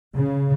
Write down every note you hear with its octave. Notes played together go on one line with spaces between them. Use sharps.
C#3